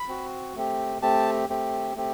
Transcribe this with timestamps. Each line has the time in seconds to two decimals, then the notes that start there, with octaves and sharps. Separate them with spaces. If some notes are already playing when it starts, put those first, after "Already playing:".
Already playing: B5
0.08 C4 F#4
0.56 A3 C4 G4
1.02 A3 C4 G4 A5
1.49 A3 C4 G4
1.95 A3 C4 G4